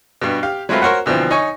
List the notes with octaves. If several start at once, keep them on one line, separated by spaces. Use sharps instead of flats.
G2 B2
G4 F5
F#3 G#3 A3 C4 F4 B4
F#4 A#4 C5 C#5 F#5
D2 B2 E3 F3 C4
D#4 C#5 G#5 C#6